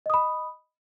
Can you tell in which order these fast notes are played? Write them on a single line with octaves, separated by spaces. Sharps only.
D#5 D#6 B5